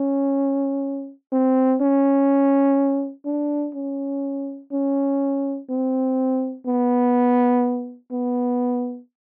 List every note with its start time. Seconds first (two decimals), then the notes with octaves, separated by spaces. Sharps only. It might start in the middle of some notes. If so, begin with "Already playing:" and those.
Already playing: C#4
1.32 C4
1.81 C#4
3.25 D4
3.75 C#4
4.72 C#4
5.69 C4
6.66 B3
8.12 B3